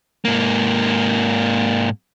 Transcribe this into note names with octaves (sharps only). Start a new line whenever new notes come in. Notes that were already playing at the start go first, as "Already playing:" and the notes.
G#2 A#3